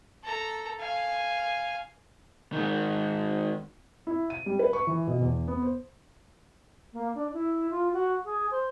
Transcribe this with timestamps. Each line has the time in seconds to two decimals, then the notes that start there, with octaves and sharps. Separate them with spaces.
0.24 A4 A#5
0.80 F5 G#5
2.53 D#3 G#3
4.07 E4
4.30 D#7
4.46 G3
4.59 B4
4.73 C#6
4.87 E3
5.07 B2
5.21 E2
5.48 B3
5.62 C5
6.93 A#3
7.15 D4
7.34 E4
7.70 F4
7.93 F#4
8.25 G#4
8.51 C5